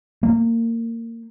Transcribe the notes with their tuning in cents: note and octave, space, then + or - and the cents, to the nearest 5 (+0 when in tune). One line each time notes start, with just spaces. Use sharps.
A#3 -25